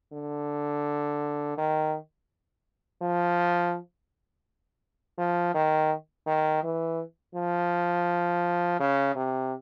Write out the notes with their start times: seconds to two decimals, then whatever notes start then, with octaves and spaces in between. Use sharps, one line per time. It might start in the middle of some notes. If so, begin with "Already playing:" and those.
0.13 D3
1.57 D#3
3.01 F3
5.18 F3
5.54 D#3
6.27 D#3
6.63 E3
7.35 F3
8.80 C#3
9.15 C3